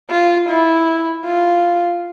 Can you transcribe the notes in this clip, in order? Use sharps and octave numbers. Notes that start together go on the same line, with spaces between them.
F4
E4
F4